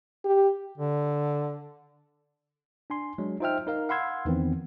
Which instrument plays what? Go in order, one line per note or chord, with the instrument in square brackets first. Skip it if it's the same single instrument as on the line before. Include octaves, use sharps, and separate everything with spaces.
[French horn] G4
[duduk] D3
[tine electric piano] D4 G#5 C6
F#3 G#3 D4
D#4 F4 C5 E5 G5 F6
D#4 A#4 F5
F5 F#5 B5 C6 E6 G#6
E2 D#3 E3 B3 C4